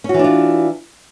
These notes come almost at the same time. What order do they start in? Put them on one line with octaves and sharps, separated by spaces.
C#4 F#4 E3 D4 F4